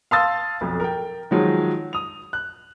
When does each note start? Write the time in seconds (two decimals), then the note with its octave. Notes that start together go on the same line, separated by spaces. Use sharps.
0.11 F5 A5 C6 D#6 E6 A6
0.61 B1 F2
0.80 A#4 G5
1.31 D#3 F3 F#3 G#3
1.93 D#6 F7
2.33 F#6